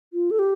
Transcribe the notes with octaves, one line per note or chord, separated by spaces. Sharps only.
F4
A4
G4